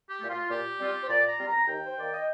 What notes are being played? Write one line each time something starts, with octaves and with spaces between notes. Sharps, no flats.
G4
A#2 A3
F4
A#2 G4
G3 C4 F4
C5
A#2 D5
A#5
G3 C4 F4
A#5
D#2 G5
C5
D#3 A#3 D5
D#5